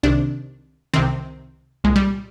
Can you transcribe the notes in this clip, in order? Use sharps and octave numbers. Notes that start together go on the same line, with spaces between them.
C2 C3 D#3 D4
C2 C3 D#3 C4
C2 A#2 G#3
G3